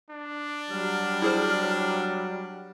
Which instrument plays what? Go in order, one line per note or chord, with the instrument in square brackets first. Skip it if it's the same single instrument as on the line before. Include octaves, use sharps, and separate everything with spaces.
[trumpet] D4
[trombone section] F#3 G3 [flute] F6
[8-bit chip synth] E4 G#4 C5